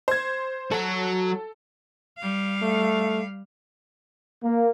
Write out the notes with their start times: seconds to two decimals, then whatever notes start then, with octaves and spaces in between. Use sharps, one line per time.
0.08 C5 G#6
0.71 F#3 F#4 A4
2.19 G3 F5
2.62 A3
4.43 A#3